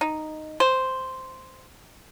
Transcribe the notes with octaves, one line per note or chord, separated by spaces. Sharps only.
D#4
C5